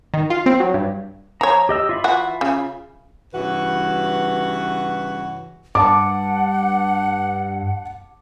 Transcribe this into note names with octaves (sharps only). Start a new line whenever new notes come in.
D#3
F4
C4
F#3
G2
F3 C#5 A#5
G4 D#5 E6
F4 E5 B5
E3 F#4 F#5
C#3
G2 C#3 E3 F#4 B4 F#5
G2 F#5 A5 D6